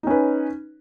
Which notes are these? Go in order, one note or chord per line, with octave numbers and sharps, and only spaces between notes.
C#4 D#4 B4